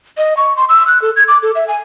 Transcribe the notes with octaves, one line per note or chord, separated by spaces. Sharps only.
D#5
C#6
C6
E6
F#6
A4
G#6
D6
A4
E5
G#5